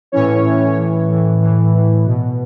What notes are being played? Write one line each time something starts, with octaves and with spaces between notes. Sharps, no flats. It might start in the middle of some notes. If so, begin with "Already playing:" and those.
A2 E3 C#4 C#5
A2 E3
A2 E3
A2 E3
A2 E3
A2 E3
B2